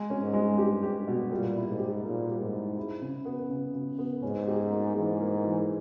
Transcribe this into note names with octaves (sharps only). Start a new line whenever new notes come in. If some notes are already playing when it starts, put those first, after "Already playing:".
Already playing: G#3
C#4
G#2
G#3
G2 G4
G4
G2
B2
A#2 G3
E4
G#2
G4
A#2 A#3
G3
G#2
E4
E4
C#3
B3
C#3
C#3
B3
G#2 C#4
G4
A#3
G#2 E3
A#3
E3